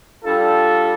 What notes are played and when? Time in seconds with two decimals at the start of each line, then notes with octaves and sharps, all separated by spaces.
0.24 G3 D4 F4 A4